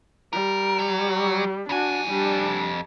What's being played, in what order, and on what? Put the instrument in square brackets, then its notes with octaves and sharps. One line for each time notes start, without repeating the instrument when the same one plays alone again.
[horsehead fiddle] G3 [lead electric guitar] A#4
[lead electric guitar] F#3
[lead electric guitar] F2 G#5 [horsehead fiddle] D4 F#4
[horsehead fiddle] G3 D4